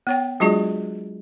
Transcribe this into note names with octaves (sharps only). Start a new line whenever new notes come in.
B3 C#5 G5
F#3 G#3 D4 F4 F#4 G#4